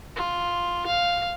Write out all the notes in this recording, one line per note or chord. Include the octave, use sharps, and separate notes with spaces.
F4
F5